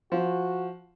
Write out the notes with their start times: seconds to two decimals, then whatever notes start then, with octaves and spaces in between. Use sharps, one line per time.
0.12 F3 F#4